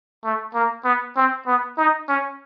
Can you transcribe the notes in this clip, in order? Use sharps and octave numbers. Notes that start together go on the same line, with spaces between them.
A3
A#3
B3
C4
B3
D#4
C#4